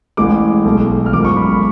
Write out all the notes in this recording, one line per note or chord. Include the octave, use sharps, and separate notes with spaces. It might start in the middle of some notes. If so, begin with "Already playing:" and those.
A1 A2 G#3 D6
B1 B2 A3
F6
G#1 F#2 F3 G#3 D6
C#6
B5
B5